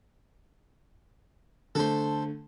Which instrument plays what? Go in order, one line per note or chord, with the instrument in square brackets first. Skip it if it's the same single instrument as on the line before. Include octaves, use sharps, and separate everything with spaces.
[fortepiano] D3 A3 [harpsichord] A4 C5